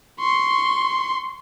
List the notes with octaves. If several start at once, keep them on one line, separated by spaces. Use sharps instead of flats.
C6 C#6